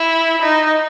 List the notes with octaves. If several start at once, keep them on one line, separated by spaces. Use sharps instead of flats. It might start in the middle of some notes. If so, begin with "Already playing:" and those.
Already playing: E4
D#4